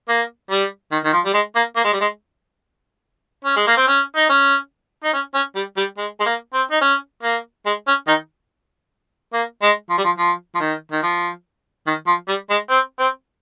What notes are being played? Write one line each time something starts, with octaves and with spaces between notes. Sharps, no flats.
A#3
G3
D#3
D#3
F3
G3
G#3
A#3
A#3
G#3
G3
G#3
C#4
G#3
A#3
C4
C#4
D#4
C#4
D#4
C#4
C#4
G3
G3
G#3
G#3
A#3
C4
D#4
C#4
A#3
G#3
C#4
D#3 D#4
A#3
G#3
F3
G3
F3
F3
F3
D#3
D#3
F3
D#3
F3
G3
G#3
C4
C4